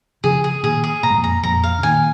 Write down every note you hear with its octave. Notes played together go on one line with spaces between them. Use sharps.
C#3 F3 G#4
G#4
A#2 D#3 G#4
G#4
A#2 A#5
G#2
F2 A#2
A#5
F2 A#2 A#5
F5
C#3
A#2 D#3 G#5